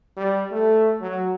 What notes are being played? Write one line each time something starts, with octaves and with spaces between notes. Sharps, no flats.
G3
A3
F#3